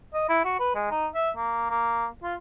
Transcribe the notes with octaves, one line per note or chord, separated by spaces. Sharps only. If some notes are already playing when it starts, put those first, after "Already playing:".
D#5
E4
F#4
B4
G#3
D#4
E5
A#3
A#3
F4